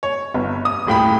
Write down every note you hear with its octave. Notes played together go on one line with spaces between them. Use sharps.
C#5
G1
D#6
D#1 A2 G5 B5